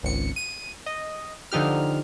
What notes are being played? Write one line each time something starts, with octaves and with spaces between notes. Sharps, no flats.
G#1 C#2 C#7
D#7
D#5
D3 F3 D#4 G4 F6